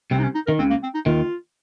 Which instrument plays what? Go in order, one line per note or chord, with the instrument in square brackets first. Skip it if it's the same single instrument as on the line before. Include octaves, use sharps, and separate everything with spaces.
[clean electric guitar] C2 C3 [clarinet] C4
[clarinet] D#4
C#4
D#4
[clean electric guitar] D#3 [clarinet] A#4
[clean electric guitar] C#2 C#3 [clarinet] C4
[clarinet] A#3
C4
D#4
[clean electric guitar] D#2 D#3 [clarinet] F4